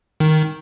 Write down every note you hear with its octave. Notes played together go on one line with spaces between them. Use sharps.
D#3